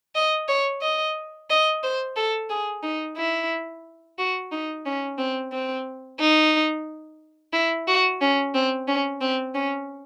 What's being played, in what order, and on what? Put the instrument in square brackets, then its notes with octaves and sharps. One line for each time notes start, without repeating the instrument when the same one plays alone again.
[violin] D#5
C#5
D#5
D#5
C5
A4
G#4
D#4
E4
F#4
D#4
C#4
C4
C4
D#4
E4
F#4
C#4
C4
C#4
C4
C#4